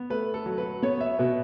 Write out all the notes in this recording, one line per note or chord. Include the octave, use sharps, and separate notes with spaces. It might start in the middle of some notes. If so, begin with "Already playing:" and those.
Already playing: B3
A3 B4
A4
F#3
B4
B3 C#5
E5
B2 B4